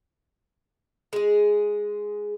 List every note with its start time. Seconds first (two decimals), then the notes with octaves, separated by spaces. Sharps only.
1.13 G#3 G#4